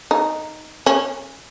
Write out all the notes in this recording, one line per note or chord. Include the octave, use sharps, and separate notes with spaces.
D#4
C#4